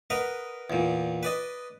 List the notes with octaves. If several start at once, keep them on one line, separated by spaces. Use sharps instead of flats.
A#4 B4 D#5 F#5
E2 A#2
B4 D5 D#5